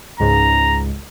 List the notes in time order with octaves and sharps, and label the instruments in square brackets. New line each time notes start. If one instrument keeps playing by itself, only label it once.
[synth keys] C#2 G#2 [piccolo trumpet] A#5